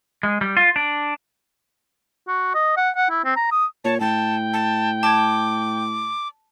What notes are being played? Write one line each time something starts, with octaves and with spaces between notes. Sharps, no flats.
G#3
G3
F4
D4
F#4
D#5
F#5
F#5
E4
C4
A#5
D#6
A#2 C#5 A5
A2 G5 A5
A5
A5 D6 G#6